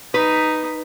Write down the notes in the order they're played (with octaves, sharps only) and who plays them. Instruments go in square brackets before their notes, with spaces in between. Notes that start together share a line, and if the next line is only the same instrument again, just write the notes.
[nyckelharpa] D#4 [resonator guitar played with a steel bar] B4